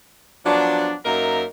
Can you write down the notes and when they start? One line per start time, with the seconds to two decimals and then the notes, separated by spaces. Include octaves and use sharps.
0.45 F3 F#3 B3 D4
1.05 F#2 A#3 D#4 A#4 E5 A#5